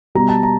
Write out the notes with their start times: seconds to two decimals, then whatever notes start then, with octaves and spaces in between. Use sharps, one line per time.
0.15 B2 G3 B3 A#5
0.29 A5
0.43 A#5